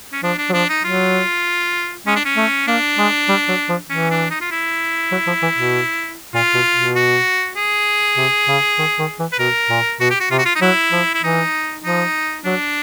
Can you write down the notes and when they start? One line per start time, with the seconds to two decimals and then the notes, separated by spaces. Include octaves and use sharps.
0.12 C#4
0.23 F3 D4
0.38 D4
0.50 F#3
0.53 F3 D4
0.69 D#4
0.84 F#3 F4
2.06 G#3 C#4
2.16 D4
2.25 C#4
2.37 A3
2.67 A#3 D4
2.98 G#3
3.29 G3
3.49 F#3
3.69 F3
3.90 E3 C#4
4.10 D4
4.30 D#4
4.41 F4
4.51 E4
5.12 F#3
5.27 F3
5.42 E3
5.57 B2
6.34 A#2 F4
6.54 B2
6.74 B2
6.95 F#4
7.57 G#4
8.17 C3
8.48 C#3
8.79 D#3
8.99 D#3
9.19 E3
9.32 B4
9.39 B2 A#4
9.70 A#2
10.00 B2 F#4
10.10 G4
10.20 F#4
10.31 C3 F4
10.38 F#4
10.45 F4
10.55 D#4
10.61 F#3 E4
10.92 F3
11.14 E4
11.23 E3 D#4
11.84 F3 D#4
12.45 F#3 D4